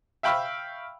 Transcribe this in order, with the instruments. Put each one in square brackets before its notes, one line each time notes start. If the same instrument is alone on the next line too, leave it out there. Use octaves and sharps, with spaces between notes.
[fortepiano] E5 F5 G5 B5 C#6 E6